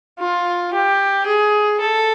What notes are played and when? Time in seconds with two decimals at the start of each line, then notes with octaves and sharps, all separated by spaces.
0.20 F4
0.73 G4
1.27 G#4
1.80 A4